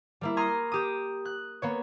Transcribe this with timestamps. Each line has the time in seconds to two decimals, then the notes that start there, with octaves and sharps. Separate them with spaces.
0.21 G3 A#3 E4
0.37 A#5 C6 D#6 F6 G#6
0.72 G4 D#6
1.25 F#6
1.62 A#3 B3 C#5